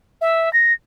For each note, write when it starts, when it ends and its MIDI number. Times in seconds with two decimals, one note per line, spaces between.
0.21 0.52 76
0.53 0.73 94